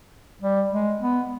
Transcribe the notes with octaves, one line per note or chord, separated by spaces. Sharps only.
G3
G#3
B3